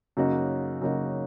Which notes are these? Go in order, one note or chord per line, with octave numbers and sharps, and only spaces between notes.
F#2 C#3 A#3 D#4 F#4
F#2 C#3 A#3 D#4 F#4